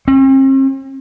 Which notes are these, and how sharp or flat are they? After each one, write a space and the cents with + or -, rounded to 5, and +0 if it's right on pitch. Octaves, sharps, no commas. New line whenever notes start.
C4 +45